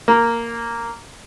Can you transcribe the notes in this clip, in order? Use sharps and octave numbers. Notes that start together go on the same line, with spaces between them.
A#3